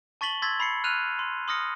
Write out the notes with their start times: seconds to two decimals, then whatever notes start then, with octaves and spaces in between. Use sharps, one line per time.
0.21 A5 C#6 A6 B6 F#7 G7
0.42 C6 E6 G#6 A6 B6
0.60 B5 C7 C#7
0.84 F6 F#6 D#7 F7
1.19 C6
1.48 C6 D#6 F6 A#6 C#7